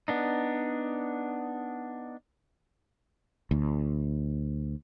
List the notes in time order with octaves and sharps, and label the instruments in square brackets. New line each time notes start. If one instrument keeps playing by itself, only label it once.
[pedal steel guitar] B3 D4 D#4
[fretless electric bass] D2